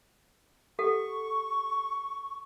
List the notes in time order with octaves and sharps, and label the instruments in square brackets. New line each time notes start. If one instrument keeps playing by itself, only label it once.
[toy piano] G4 A4 F#5 [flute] C#6